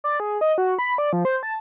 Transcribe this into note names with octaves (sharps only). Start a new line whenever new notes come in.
D5
G#4
D#5
F#4
B5
D5
F3
C5
A5